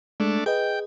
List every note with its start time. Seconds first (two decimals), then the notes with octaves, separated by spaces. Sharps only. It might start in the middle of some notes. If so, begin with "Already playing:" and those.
0.20 G#3 A3 D4
0.46 G#4 B4 D#5 G5